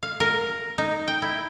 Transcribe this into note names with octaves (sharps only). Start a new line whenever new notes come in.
F5
A#4
D#4
G5
E4